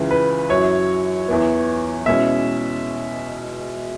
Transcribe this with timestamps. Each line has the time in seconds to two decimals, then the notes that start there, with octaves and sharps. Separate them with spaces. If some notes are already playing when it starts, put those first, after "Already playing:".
Already playing: C#2 C#3 E3
0.11 B4
0.49 F#2 F#3 E4 C#5
1.28 E2 E3 B3
2.06 B2 G#3 C#4 E4 E5